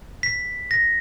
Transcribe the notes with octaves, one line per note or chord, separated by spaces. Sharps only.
B6
A#6